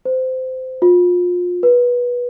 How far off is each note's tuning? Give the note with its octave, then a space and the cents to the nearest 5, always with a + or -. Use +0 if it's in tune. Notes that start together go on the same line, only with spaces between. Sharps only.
C5 -20
F4 +30
B4 -20